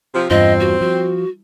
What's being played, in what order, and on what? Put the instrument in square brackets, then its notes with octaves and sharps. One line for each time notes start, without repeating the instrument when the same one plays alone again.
[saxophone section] C3 F3
[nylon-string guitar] E2 G2 F4 [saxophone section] C4 [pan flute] D#5
[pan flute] F#4
[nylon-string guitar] F3 [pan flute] F#4